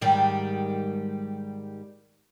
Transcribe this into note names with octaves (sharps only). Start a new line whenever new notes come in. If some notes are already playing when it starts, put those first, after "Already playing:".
G#2 D#3 G3